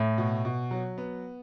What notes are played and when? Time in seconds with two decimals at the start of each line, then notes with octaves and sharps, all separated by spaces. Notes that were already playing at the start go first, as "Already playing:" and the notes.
Already playing: A2 A3
0.18 B2
0.45 B2
0.71 F#3
0.98 B3